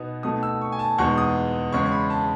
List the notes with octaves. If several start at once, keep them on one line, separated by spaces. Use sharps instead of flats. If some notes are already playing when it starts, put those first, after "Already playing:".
Already playing: B2 B3 D#4
B2 A3 D#4 D#6
E6
C#6
G#5
A5
E2 B2 G#3 B3 D#4 C#6
D#6
E2 C#3 G#3 C#4 C#6
C#6
B5
A5